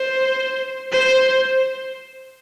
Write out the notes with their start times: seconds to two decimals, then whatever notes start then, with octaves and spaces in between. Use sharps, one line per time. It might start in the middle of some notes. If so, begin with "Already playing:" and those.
Already playing: C5
0.92 C5